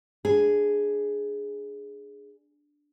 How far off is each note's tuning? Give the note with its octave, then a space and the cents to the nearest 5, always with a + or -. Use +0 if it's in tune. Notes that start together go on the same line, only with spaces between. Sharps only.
D4 +0 G#4 +0